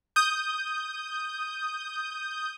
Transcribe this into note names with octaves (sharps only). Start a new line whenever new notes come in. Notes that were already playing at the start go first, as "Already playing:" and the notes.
D#6 G6